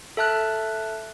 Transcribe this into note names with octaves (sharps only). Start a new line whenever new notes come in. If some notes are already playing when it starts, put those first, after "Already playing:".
A4 E5 A5 F6 F#6